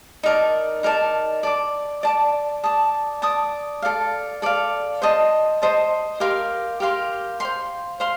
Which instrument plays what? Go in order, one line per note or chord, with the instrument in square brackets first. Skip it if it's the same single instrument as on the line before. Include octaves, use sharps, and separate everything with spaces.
[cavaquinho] D#4 A#4 D5 A5
D#4 A#4 D5 A5
D5 A5 D6
D5 A5 D6
D5 A5 D#6
D5 A5 D#6
A4 D5 F5
A4 D5 F5
C5 D#5 A5
C5 D#5 A5
G4 A#4 F5 C6
G4 A#4 F5 C6
C5 F5 C6
C5 F5 C6